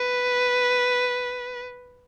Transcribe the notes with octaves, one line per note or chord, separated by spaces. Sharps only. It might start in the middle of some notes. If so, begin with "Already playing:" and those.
Already playing: B4